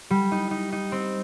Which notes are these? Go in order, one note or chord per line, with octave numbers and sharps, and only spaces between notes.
G3
D#4
D#4
D#4
C4